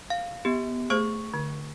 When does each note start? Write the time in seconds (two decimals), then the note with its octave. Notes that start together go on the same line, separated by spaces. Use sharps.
0.10 F5
0.45 B3 G4
0.90 A3 G#4 C5 C#6
1.34 D3